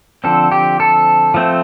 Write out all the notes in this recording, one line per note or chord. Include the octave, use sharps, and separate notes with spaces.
D3 F3 C4 A4
G4
A4
F3 A3 C4